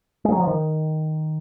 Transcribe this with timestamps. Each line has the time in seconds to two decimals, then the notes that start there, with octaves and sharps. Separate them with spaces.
0.25 G#3
0.32 F#3
0.40 F3
0.47 D#3